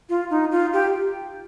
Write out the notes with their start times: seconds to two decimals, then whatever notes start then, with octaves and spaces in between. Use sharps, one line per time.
0.09 F4
0.30 D#4
0.52 F4
0.73 G4